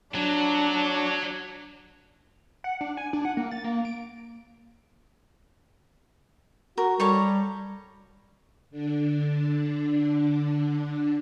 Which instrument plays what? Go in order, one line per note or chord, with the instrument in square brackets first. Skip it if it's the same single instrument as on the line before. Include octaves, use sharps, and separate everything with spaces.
[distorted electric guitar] F#3 [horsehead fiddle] D4
[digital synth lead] F#5
D4
G#5
D4
F#5
A#3
A6
A#3
D7
[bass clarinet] F#4 [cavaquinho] A#4
[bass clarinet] G3 [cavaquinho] A4 C#5 A#5
[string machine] D3 D4